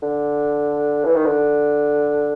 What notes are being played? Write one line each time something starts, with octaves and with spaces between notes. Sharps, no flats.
D3
E3
D#3
D3